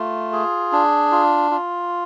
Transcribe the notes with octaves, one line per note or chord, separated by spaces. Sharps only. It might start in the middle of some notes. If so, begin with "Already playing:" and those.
Already playing: A3 F4
G#4
D4
F4
F4